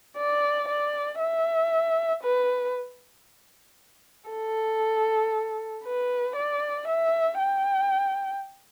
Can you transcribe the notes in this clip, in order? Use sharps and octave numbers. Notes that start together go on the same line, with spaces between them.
D5
D5
E5
B4
A4
B4
D5
E5
G5